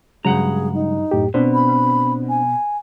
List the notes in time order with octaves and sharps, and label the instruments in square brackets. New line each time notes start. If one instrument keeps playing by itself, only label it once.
[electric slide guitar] G2 F#5 A#5 [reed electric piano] C#3 F#3 G#3 [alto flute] G#4
[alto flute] D#4
[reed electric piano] F#2 A2 G4
[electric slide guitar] B2 [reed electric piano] C4 D4 C5
[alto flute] B5
G#5